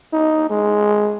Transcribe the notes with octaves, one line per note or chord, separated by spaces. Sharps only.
D#4
G#3